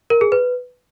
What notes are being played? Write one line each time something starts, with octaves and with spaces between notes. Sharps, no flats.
A#4
G#4
B4